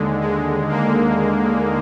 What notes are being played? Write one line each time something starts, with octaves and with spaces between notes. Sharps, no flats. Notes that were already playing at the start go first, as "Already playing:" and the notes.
Already playing: D#2 D3 G#3
G#3
A#3